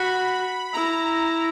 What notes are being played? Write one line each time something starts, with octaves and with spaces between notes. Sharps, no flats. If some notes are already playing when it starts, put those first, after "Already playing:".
Already playing: F#4 B5
E4 A#5